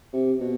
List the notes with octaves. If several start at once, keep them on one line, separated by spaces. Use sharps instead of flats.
C3
B2